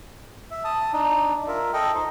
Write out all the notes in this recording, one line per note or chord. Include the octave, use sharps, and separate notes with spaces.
E5
A5 D#6
D4 D#4
F4 A#4 E5
A4 D#5 G5
D#4 C5